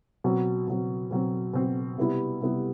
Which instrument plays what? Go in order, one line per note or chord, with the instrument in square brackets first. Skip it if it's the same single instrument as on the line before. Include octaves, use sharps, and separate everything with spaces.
[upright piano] B2 F#3 C4
B2 F#3 C4
B2 F#3 C4
B2 F#3 C4
C3 G3 B3 E4
C3 G3 B3 E4